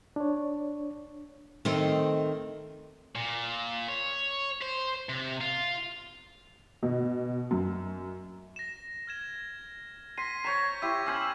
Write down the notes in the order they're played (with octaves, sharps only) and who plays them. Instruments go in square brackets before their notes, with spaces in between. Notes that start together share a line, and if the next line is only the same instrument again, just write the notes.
[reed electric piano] D4 C#5
[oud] D#3 A3 C4
[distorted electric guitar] A#2
C#5
C5
C3
F4
[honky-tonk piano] B2
F#2
[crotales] A#6 E7
F6 G#6 E7
[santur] C6 [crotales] A#6 B6 D#7
[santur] C5 C#5 A#5 [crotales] B6 E7
[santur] E4 G4 [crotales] C#6 G#6 B6
[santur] C#4 C5 B5 [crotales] E6